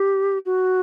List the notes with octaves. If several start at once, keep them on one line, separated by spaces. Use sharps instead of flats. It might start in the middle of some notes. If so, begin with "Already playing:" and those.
Already playing: G4
F#4